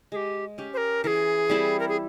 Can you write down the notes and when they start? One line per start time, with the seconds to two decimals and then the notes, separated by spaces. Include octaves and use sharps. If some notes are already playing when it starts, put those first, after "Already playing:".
0.12 G#3 G#4
0.16 G4
0.58 C#4 G4
0.74 C5
0.77 A#4
1.04 E3 G#4 A#4
1.50 G3 C4 E4
1.79 A#4
1.89 G#4